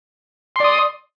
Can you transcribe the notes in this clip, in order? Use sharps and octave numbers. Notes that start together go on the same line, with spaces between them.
D5 C6 D#6